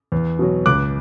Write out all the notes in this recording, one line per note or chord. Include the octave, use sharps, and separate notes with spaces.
E2
B2 F#3
C#2 D6 F#6